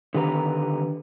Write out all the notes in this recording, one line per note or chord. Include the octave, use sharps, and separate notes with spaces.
D3 D#3 G4 B4 A#5